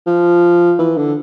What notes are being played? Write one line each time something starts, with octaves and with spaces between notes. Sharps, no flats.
F3
E3
D3